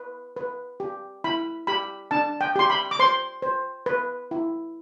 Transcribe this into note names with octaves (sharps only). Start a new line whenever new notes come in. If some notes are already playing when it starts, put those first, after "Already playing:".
Already playing: B4
B4
G4
E4 B5
G4 B5
D4 A5
G5
G4 C6
B5
D6
C5 C6
C5
B4
E4